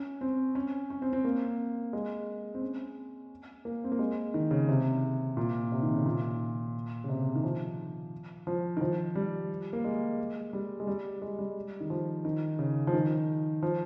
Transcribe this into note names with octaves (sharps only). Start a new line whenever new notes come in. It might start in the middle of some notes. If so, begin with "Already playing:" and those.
Already playing: C#4
C4
C#4
C#4
C4
C4
A#3
G#3
C4
C#4
A#3
C4
A#3
G#3
D#3
C#3
C3
A#2
C3
D#3
C#3
A#2
C#3
C3
D#3
F3
F3
D#3
F3
G3
A#3
G#3
G3
G#3
G3
G#3
G3
D#3
F3
D#3
C#3
F3
D#3
F3